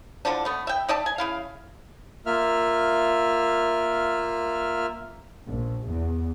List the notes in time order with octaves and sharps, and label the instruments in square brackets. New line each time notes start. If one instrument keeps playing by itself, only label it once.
[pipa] D3 E3 F3 D4
A3 B3
E5 G5
D#4 D5 E5 A5
G#5
C#3 E4 F5
[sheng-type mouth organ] A#3 F4 E5 F6
[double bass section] A#1
E2